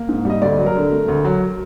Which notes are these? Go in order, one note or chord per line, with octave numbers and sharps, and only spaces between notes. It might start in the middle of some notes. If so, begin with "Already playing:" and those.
Already playing: A#3
G#2
G3 D#5
D2 D5
F#3
A#4
D3
A3
D2
F#3